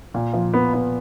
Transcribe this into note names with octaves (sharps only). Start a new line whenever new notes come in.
A#2
F3
B3
B3